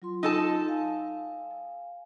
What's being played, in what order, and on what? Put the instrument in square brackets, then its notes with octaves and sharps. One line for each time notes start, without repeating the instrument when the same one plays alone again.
[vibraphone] F#3 F4 C6
[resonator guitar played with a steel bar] D#4 A4 A5
[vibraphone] F5 G#5